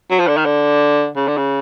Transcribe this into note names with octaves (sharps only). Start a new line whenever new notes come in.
F#3
F3
D3
D#3
D3
C#3
D3
C#3